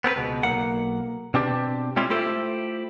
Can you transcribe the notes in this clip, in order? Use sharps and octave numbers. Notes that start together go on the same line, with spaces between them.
B3 C4 A#4 B4
C#2 B2
B1 B2 A#3 F#5
B2 C4 D4 G4
G3 G#3 C4 C#4 E4 F4
A3 E4 F4 G4 A4 C5